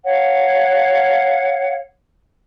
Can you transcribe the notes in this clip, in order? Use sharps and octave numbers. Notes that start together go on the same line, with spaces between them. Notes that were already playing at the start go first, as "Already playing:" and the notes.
C#5 F5 F#5